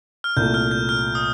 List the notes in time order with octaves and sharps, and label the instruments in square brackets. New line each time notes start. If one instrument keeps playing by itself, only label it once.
[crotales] F6
[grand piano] C2 A#2 A3 [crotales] G6
[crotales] F6
G6
F6
D#6